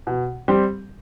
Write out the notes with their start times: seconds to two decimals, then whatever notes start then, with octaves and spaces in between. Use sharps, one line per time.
0.07 B2
0.48 G3 C4 G4